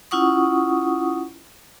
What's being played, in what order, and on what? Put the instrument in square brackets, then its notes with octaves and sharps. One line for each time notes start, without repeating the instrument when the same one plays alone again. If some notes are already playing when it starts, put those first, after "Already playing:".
[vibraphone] C#4 E4 F4 F#5 C#6 D#6